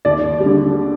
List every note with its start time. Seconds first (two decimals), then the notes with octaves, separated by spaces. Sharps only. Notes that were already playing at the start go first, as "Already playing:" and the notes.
0.05 D#2 D5
0.40 G3
0.46 D3